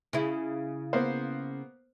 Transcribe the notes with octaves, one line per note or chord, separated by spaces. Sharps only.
C#3 E4
A#3 B3 C5